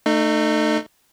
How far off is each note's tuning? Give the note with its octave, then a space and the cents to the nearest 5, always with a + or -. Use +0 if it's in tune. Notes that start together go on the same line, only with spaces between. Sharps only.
A3 +15 D#4 -30